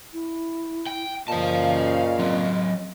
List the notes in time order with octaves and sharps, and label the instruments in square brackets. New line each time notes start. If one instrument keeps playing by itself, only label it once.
[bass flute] E4
[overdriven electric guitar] G5
[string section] F#2 C#3 F5 [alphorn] A#2 [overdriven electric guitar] C5 A5 [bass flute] D#5
[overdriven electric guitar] F#3 C4